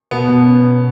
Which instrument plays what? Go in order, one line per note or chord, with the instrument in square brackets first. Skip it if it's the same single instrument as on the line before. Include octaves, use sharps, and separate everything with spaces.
[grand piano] B2 [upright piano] B3
[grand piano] B2
C#4
B2